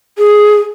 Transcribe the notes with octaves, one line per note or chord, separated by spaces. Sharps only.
G#4